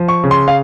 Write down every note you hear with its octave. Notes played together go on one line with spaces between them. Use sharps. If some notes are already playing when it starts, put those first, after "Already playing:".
Already playing: F3
C#6
C#3
C6
F5